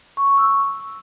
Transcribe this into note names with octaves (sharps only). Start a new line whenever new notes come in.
C#6
C#6
E6